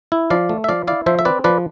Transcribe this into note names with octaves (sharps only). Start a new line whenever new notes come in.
E4
F3 D5 F5
A3
E5
F3 D5 F5
E4 D5 F5
F3 C5 E5
E5
C4 B4 D5
F3 B4 D5